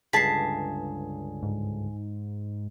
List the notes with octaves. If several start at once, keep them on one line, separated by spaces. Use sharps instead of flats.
C#2 G2 D3 G#4 A5 B6 C7
G#2